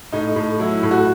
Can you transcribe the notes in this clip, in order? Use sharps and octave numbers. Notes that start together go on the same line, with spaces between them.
A2 D#4
A2
F#3 E4
A2
F#4